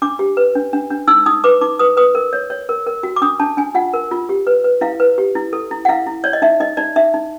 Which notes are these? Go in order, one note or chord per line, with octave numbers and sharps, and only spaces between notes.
D4 D6
G4
B4
D4
D4
D4
D#4 E6
D#4 D#6
B4 D6
D#4 D6
B4 D#6
B4 D#6
A#4
C#5
C#5
A#4
A#4
F#4
D6
D4 D#6
D4 A5
D4 G#5
F4 F#5
A#4
F4
G4
B4
B4
E4 F5
B4
G4
E4
A4
E4
F#5
E4 F5
E4
C#5 D5
D#5
D#4 E5
D#4 D#5
D#4 D5
D#4 E5
D#4